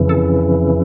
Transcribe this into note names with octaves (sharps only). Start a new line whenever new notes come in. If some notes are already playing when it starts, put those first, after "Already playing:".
Already playing: F2 C#3 E3
A4